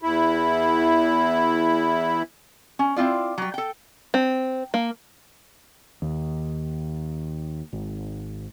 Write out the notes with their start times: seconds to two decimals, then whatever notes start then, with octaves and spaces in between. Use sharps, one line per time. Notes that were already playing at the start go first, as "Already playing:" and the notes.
0.02 E2 E4
2.79 C#4
2.96 C4 E4 F4 D5
3.38 F#3 G3
3.54 A4 G5
4.14 C4
4.74 A#3
6.02 D#2
7.73 G#1